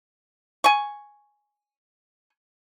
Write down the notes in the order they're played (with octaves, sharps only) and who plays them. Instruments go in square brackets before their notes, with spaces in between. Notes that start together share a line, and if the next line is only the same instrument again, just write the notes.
[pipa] G#5 C#6